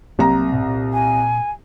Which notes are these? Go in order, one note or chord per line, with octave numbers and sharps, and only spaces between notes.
C2 C3 F#3 A#3 A#5
G#2 B2
A#2
G#5